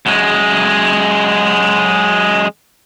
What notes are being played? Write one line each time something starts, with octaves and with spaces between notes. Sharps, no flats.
F#2 G#3